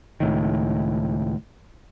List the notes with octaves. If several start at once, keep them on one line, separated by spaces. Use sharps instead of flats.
C#2 A2 D#3